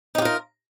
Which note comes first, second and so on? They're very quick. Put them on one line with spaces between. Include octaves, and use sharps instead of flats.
D#4 G4 F4 A#4